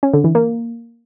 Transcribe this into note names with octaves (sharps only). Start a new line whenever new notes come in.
C#4
D3
E3
A#3